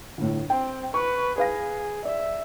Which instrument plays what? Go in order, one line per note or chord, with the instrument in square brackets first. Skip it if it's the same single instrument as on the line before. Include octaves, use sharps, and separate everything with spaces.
[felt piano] G1 A2
[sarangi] C4 [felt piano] G5
[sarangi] B4 [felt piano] C#6
[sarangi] G#4 [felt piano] B4 F5 A#6
[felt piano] D5 [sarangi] E5